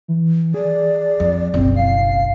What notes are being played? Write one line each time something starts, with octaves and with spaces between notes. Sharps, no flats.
E3
G#4 D5
F2
F#1 B1 C4
F5 C7